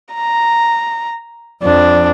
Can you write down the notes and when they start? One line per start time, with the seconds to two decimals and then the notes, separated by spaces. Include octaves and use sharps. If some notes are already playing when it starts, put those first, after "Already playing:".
0.14 A#5
1.63 F2 D4